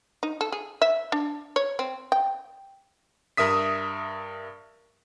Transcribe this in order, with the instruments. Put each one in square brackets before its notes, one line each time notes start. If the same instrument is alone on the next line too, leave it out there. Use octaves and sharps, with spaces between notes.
[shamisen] D#4
A4
G#4
E5
D4
C#5
C4
G5
[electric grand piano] G2 A#4 E5 D#6 B6